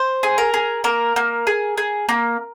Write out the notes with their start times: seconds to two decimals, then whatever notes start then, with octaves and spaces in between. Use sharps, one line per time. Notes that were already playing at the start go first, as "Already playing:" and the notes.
Already playing: C5
0.23 G#4
0.38 A#4
0.54 G#4
0.84 A#3 A#4
1.16 A#3
1.47 G#4
1.77 G#4
2.09 A#3